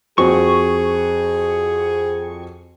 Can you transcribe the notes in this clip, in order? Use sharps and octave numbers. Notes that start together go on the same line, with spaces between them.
F2 C4 F#4 G#4 C#6